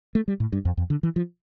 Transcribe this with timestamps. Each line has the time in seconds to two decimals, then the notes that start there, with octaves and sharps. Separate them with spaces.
0.15 A3
0.28 G3
0.40 A2
0.52 G2
0.65 F2
0.77 F2
0.90 D3
1.03 E3
1.16 F3